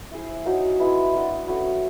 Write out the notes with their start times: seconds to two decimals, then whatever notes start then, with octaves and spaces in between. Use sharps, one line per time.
0.11 E4 G#4 C5
0.45 F#3 A#3 D#4
0.79 G#3 B3 E4
1.13 D4 F#4 A#4 D#5
1.47 A3 C#4 F#4 B4